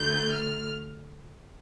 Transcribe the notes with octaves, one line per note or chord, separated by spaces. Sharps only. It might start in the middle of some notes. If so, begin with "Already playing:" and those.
Already playing: D2 D3 A3 G6
F6